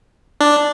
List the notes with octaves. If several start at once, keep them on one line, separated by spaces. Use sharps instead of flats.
D4